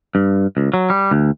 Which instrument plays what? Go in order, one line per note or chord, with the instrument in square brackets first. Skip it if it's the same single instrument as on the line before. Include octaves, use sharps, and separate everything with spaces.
[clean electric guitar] G2
C#2
F#3
G3
D2